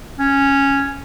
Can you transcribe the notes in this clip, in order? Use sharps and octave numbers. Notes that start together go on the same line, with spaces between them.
C#4